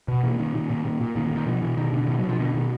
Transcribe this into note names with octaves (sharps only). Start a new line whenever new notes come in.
B2
A#2 E3
A#2 D#3
A#2 D#3
A#2
A#2
A#2
A#2 D#3
D#3
A#2
D#3
B2 F3
B2 E3
B2 D#3
B2 D3
D3
B2 D#3
F#3
B2
F3
B2 D3
B2 D#3